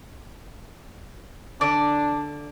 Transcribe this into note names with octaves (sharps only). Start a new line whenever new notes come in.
D3 D4 D5